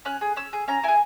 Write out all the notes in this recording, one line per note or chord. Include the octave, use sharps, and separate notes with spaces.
C#4 F#6
G#4
C#4 E6
G#4
C#4 A#5
E4 G#4 G#5